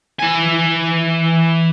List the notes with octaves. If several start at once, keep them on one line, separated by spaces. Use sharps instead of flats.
E3 G#5